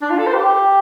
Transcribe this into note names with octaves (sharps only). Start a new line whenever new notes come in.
D4
F4
A4
C5
G4